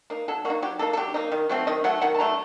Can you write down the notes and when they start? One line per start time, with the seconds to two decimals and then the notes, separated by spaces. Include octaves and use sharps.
0.10 A#3 D#4
0.28 F#3 A4
0.45 A#3 F#4
0.50 D#4
0.62 F#3 G4
0.79 A#3 D#4 A4
0.93 A4
0.97 F#3 G4
1.14 A#3 D#4
1.32 D#3
1.49 F#3 A3 C4
1.67 D#3 D#5
1.84 F#3 A3 F#5
2.02 D#3 F#5
2.14 A5
2.19 F#3 A3 A#5